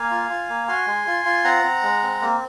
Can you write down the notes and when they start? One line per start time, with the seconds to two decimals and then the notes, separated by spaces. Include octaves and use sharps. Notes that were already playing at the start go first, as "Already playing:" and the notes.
Already playing: A#3 F5 G#5
0.11 F4
0.30 F4
0.49 A#3
0.68 F#4 G#5 C6
0.87 G#3
1.07 F4
1.25 F4
1.44 C4 F#5 A#5
1.64 C4
1.83 G#3
2.03 C4
2.22 A#3